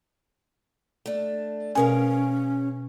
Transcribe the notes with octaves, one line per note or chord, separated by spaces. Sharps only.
A3 D4
B2 C#4 G#4 A#4 F5 G#5